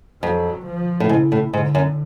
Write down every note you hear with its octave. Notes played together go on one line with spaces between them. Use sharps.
F2 F#3
F3
A2
G#2 C#3
A2
G#2 D3
F#2